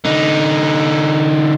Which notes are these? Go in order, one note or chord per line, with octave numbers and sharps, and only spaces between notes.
D3 D#4